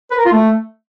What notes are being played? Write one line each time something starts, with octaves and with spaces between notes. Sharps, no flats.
B4
A#4
F4
A3